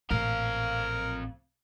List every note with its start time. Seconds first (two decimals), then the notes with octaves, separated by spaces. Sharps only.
0.11 A1 A#2 C4 A#4 F5